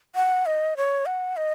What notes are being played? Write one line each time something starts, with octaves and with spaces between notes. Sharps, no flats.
F#5
D#5
C#5
F#5
D#5